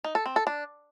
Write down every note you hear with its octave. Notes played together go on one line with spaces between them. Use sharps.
D#4
A4
C4
A4
D4